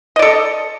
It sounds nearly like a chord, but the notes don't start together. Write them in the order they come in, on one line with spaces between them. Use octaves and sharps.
D#5 D5 A4